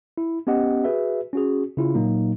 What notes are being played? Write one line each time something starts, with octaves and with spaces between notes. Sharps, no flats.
E4
B3 C#4 G4 D#5 F#5
F#4 G#4 B4 E5
C#4 F#4 G#4
C#3 E4 F4
A#2 F#3 A#3 D#4